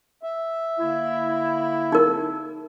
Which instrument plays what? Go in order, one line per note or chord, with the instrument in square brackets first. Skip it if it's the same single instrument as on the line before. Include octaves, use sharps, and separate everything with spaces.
[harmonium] E5
[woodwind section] D3 A#3 E4
[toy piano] D#4 A#4